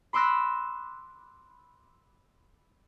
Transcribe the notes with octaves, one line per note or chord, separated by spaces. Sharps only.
B5 C6 D6 E6 F#6 A#6